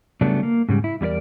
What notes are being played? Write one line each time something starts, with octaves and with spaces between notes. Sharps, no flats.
C#3 F#3 G3 A3 B3 D4
A#3
G#2 C#3 G3
E4
E2 G3 E4 A#4 D5